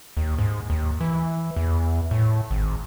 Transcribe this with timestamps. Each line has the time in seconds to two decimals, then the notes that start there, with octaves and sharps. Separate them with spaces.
0.17 D#2
0.39 G#2
0.70 D#2
1.01 E3
1.56 E2
2.11 A2
2.51 G#1